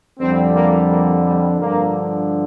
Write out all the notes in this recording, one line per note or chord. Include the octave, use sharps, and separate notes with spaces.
F2 D3 G3 C4
A#3
A#3
G3
G2 D3 F3 A#3